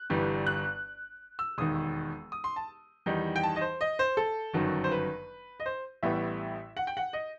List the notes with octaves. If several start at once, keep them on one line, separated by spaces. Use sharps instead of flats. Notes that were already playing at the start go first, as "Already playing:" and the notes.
Already playing: F#6
G1 G2 E3 G3
F#6
E6
E1 D#2 D#3 D#6
D#6
C6
A5
E2 D#3 G3 D#4
G5
A5
D#5
C5
D#5
C5
A4
G1 F#2 D#3 F#3
C5
B4
D#5
C5
A1 A2 G3 B3 E5
F#5
G5
F#5
D#5